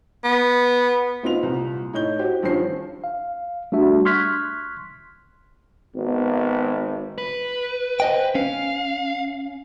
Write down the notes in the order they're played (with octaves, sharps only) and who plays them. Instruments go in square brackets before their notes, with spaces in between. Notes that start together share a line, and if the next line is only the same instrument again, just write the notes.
[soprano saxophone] B3
[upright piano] A#2 C4 D#4 F4 B4 F7
C2 A#2
A2 D#4 C#5 G6 G7
F#4 G4 C5
G2 D#3 F3 C#4 C5 C7
[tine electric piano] F5
G3 A3 D4 F#4 E5
C6 C#6 F6 F#6 G#6 B6
[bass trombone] G#1 [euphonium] B3
[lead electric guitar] B4
[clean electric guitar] C5 D#5 G5
[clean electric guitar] C#4 [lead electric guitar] F5